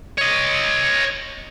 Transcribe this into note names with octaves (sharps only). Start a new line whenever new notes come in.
C#5 D#5